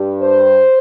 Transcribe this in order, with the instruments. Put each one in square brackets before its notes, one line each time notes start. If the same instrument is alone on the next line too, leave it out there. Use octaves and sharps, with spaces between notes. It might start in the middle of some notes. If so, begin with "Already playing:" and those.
Already playing: [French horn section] G2 G3
C5